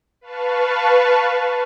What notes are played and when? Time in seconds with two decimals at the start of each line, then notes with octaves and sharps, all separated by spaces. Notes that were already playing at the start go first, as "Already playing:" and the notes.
0.21 B4 F5 A5 C#6